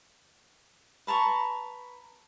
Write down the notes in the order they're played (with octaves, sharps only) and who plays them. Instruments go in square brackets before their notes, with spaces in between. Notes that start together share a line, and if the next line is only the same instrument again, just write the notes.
[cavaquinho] B4 A5 A#5 C#6